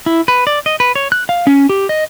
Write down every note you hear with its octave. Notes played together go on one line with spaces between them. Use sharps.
E4
B4
D5
D#5
B4
C#5
F#6
F5
C#4
G4
D#5